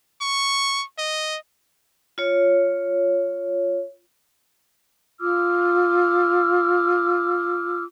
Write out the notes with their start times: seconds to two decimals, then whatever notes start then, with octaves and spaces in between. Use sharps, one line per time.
0.21 C#6
0.98 D#5
2.18 F4 C#5
5.19 F4 D6 E6 F6